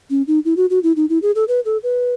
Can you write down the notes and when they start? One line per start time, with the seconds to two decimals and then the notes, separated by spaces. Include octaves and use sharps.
0.10 C#4
0.27 D#4
0.45 E4
0.57 F#4
0.70 F#4
0.83 E4
0.96 D#4
1.09 E4
1.22 G#4
1.35 A4
1.48 B4
1.65 A4
1.83 B4